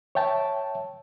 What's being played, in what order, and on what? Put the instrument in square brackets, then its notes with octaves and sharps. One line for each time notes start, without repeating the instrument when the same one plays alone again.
[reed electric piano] C#5 E5 G5 A5